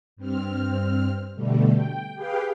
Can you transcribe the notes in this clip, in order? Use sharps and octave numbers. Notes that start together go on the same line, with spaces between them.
G2 C4 F6
B2 D3 G3 A3
G5
G4 G#4 B4 F5 G5